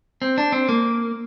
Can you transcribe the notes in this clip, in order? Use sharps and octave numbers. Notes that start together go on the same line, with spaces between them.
C4
D4
C4
A#3